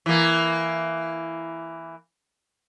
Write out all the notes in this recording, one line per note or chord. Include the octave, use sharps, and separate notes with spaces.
E3 A#3